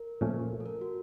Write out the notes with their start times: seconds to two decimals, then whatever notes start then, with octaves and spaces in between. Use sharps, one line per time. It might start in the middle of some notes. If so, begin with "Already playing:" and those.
Already playing: A#4
0.21 A#2 F3 A3 C#4
0.60 A4
0.66 A#4
0.81 F#4